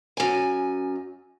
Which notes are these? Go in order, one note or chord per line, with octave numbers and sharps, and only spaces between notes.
F#2 G#5